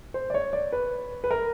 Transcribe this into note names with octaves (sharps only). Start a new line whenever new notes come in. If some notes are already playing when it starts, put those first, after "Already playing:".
C5
D5
C#5
D5
B4
B4
A#4